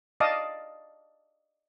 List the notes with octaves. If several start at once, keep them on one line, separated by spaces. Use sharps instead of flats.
D5 D#5 F5 A5 D6 D#6